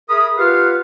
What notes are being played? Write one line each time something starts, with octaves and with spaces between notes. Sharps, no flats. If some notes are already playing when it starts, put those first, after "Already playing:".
G#4 A#4 E5 B5 D#6
F4 G4 B4 F5 F#5 F6